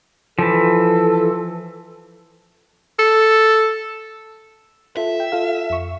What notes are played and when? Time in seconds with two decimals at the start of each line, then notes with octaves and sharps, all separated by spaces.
0.39 E3 F3 A4
2.99 A4
4.97 F4 A4 E5
5.20 G5
5.32 F4 A4 F5
5.70 F2 C#6